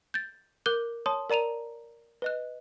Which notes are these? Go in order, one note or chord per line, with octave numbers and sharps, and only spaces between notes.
G6 A6
A#4 D6 F#6 G6 G7
C#5 A5 C6 D#6
A#4 D5 A#5 D#7 F7
B4 D#5 F#6